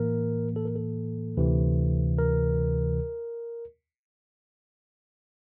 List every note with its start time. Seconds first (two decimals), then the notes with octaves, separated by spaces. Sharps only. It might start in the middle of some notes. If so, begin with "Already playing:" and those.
Already playing: A2 E3 A#3 A#4
0.56 A4
0.65 A#4
0.75 A4
1.37 D2 C3 E3
2.18 A#4